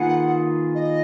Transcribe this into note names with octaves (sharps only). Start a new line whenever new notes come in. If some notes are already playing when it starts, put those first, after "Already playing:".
Already playing: D#3 A#3 F4 G#4 B4 F#5
D#5